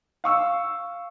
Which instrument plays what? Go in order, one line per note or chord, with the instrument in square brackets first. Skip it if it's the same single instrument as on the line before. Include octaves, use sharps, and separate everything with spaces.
[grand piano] F5 C#6 E6